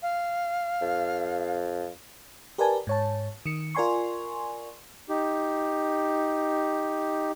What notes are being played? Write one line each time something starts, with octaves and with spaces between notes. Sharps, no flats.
F5
F2
G4 A#4 B4 D5 G#5 A5
G#2 C#5 A5
D#3 C#7
F4 A#4 D5 G#5 C6 C#6
D#4 G4